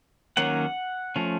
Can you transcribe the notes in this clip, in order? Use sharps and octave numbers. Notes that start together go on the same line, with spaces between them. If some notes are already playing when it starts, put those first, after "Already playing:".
D#3 F#3 A#3 C#4 F#5
F3 A3 C#4